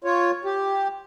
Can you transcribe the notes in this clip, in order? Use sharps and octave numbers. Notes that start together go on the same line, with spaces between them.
F4 C#5
G4